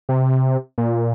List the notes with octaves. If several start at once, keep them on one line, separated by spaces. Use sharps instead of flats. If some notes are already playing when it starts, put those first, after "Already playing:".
C3
A#2